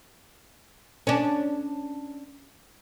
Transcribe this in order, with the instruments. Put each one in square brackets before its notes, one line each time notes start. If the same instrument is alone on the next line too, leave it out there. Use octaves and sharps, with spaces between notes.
[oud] C#4 D4